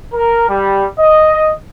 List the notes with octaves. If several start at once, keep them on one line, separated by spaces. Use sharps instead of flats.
A#4
G3
D#5